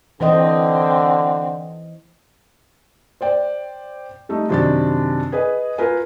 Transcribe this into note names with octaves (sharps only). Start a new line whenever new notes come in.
D3 E3 C4 C5 D#5
C5 D5 G5
G3 A3 D#4
F#2 C3 D#3 D4 A5 A6
G#4 B4 D#5 G#5
F4 A#4 B4 G#5